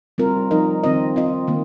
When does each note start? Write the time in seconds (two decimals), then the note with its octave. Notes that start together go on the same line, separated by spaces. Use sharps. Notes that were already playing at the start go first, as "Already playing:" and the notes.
0.18 G3 C4 F4 A#4
0.51 F3 D#4 A#4 D#5
0.83 D#3 C4 F4 D#5
1.16 C4 F4 D#5
1.48 D#3 A#3